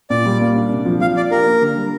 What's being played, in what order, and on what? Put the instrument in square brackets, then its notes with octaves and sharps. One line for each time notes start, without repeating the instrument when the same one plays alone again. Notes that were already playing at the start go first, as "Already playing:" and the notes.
[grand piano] A#2 [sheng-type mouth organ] D5
[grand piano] G3
A#3
D4
C3
F3
[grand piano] F3 [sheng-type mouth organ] F5
[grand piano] D4 [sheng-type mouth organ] D5
[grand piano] G4 [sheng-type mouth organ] A#4
[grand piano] A#3
D3
G3